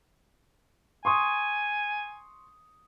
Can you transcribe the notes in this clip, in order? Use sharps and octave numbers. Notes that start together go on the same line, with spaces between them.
G#5 C6 C#6 D#6